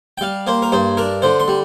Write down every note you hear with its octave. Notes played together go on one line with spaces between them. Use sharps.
G5
G3 F5
A#3 C5
A#4
G2 C5
D4 A#4
D3 C5
C6
G3